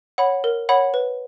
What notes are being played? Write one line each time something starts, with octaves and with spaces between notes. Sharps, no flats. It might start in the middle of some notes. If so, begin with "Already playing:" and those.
C#5 F#5 B5
A#4
C#5 F#5 B5
B4